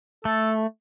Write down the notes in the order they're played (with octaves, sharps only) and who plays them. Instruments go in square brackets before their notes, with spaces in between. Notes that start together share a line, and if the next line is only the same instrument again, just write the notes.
[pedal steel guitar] A3 [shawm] A4